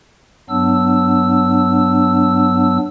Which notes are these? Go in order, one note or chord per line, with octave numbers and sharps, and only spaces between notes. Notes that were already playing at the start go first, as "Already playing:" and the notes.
G2 F#3 B3 D4 E6